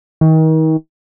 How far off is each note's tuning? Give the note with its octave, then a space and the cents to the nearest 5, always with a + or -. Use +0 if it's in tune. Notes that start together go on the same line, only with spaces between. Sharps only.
D#3 +35